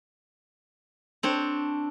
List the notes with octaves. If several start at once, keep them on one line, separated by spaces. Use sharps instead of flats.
C4 D4 C#5